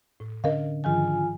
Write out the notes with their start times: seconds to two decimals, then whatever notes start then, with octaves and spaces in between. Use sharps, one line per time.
0.20 A2
0.44 D3 C#4 D4 A#4 D#5 F5
0.84 G#2 D#3 F3 F4 G#5